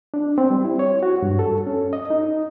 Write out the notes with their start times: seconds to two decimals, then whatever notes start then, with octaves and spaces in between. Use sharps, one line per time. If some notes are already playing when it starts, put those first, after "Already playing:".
0.14 D4
0.38 C4
0.50 G3
0.65 E4
0.79 C#5
1.03 F#4
1.22 G2
1.39 A4
1.67 C#4
1.93 D#5
2.10 D#4